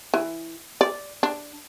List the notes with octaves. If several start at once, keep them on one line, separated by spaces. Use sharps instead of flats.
E3
D5
D4